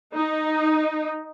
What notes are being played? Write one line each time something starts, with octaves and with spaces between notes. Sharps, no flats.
D#4